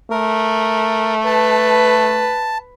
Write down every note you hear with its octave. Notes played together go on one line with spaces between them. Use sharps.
A3 A#4
B4 A5